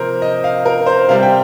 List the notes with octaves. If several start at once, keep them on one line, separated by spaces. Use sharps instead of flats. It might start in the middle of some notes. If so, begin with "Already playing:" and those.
Already playing: C3 F3 A#3 A#4 C5
D#5
F5
A#4
C5
C3 G3 C4 F5
G5